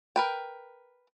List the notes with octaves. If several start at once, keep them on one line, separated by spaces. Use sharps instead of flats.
A#4 B4 G5